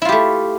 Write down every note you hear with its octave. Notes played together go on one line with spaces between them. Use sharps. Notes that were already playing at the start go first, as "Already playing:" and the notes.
A3 E4 F4 G4